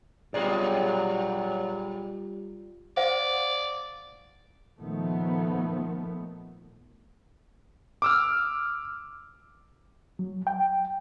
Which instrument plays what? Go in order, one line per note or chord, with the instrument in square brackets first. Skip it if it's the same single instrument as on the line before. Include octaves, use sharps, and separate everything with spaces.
[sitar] G2 A#2 G#4 [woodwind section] F#3 [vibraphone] G3 F4 G4 [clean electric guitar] D5
[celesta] C5 F5 F#5 [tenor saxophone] D5
[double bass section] A#2 D#3 F3 A3 B3
[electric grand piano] D6 E6 F6
[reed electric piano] F#3
G5